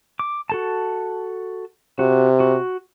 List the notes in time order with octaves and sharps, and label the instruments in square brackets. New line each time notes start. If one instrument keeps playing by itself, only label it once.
[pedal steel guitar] D6
F#4 A4 A5
[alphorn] C3 [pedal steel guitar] F#4
[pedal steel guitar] F#4